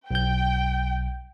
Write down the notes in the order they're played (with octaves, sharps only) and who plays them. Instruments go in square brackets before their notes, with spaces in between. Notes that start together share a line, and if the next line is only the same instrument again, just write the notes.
[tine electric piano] B1 G6 [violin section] G5